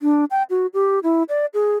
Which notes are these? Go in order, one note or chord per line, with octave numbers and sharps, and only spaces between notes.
D4
G5
F#4
G4
E4
D5
G#4